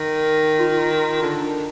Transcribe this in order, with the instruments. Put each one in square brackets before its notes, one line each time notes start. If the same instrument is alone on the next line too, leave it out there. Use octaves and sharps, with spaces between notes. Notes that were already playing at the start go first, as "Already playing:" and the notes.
Already playing: [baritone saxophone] D#3
[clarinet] F4
F4
[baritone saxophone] D3 [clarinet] D4
[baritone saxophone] D#3